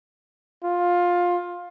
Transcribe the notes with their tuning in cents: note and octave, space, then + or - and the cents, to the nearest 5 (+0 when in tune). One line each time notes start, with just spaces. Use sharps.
F4 +15